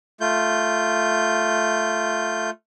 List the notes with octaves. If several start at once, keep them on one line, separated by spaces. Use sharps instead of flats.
A3 F4 G6